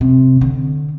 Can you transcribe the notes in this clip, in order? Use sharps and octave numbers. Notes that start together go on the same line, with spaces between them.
C3
D3